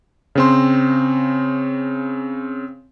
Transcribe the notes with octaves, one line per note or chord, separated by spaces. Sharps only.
C#3 C4 C6